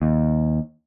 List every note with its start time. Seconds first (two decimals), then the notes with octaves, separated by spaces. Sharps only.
0.02 D#2